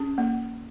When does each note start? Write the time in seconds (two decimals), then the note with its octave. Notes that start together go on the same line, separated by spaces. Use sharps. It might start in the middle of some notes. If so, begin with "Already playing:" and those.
Already playing: C#4 G#4
0.18 A#3